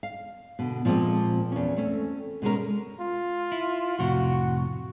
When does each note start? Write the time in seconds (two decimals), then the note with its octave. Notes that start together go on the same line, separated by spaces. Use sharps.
0.03 F5
0.59 B2 D3
0.85 A#2 F3 G#3 A#3 C4
1.52 E2 C#4
1.77 A3 C4 C#4
2.42 B2 G#3 C#4 A#4
3.00 F4
3.52 E4
3.99 F2 A2 C3 F#4